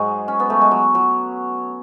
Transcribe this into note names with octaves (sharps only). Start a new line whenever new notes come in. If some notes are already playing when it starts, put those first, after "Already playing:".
Already playing: G#2 F#3 G#3
C#4
B3
A3
G#3
F#3
F#3